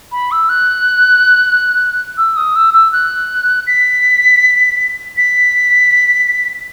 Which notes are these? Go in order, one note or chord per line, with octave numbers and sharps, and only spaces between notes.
B5
E6
F#6
E6
D#6
E6
E6
F#6
B6
B6